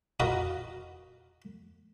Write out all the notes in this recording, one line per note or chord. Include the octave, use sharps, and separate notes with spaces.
F4 F#4 A#4 B4 D#5 A#5